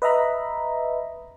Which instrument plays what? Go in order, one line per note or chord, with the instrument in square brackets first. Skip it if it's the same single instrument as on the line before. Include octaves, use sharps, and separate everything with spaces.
[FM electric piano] B4 D#5 E5 A#5 B5